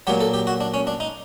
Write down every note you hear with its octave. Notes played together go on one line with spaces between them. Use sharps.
A#2 F#3 G4
A4
G4
F#4
D4
C#4
D4
D#4